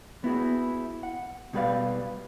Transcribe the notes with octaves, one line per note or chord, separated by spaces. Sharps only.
B3 E4 F#4 G#4
F#5
B2 G3 G#4 B4 D5 F5